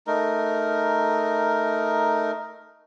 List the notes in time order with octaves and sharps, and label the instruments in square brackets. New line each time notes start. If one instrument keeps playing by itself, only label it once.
[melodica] A3 D#4 A#4